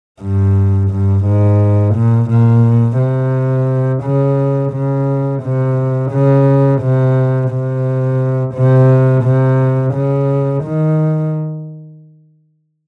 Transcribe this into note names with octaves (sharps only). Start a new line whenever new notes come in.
G2
G2
G#2
A#2
A#2
C3
C#3
C#3
C3
C#3
C3
C3
C3
C3
C#3
D#3